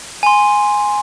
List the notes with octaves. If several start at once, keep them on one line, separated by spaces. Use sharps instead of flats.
G#5 C6